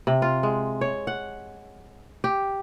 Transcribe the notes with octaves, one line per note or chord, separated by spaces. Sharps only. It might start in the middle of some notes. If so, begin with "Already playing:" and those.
C3
F4
G#3
C#5
F#5
G4